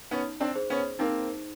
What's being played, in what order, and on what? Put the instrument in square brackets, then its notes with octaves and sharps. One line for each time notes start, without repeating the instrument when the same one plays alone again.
[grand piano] B3 C#4 [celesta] D#4
[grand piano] C4 D4
[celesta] G#4 C5
[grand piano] B3 C#4
[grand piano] A#3 C4 [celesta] D#4